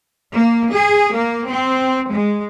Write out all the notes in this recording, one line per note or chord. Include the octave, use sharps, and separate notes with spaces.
A#3
G#4
A#3
C4
G#3